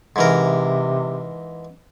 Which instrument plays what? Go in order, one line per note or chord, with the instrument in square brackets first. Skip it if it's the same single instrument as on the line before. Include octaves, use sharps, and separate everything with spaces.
[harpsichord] G#2 E3 A#4 [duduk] C3